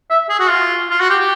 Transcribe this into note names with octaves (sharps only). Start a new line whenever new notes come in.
E5
G#4
F#4
F4
F4
F#4
G4
G4